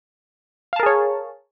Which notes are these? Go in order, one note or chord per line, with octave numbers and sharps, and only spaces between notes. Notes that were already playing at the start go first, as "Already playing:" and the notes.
G#4 A#4 C#5 F5 A5